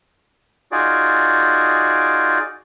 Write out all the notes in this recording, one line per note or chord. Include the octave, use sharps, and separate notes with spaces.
D#4 F4 F#4 G#4 D5